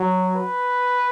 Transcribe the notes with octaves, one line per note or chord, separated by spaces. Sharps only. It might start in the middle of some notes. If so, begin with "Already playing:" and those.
Already playing: F#3
B4